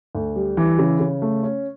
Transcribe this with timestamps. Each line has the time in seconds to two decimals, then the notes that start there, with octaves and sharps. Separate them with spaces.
0.15 D2
0.36 G3
0.57 E3
0.79 C#3
1.00 C#3
1.22 A3
1.43 C#4